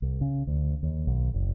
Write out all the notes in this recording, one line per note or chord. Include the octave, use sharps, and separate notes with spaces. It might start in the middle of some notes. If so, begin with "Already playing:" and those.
C2
C#3
D2
D#2
B1
F#1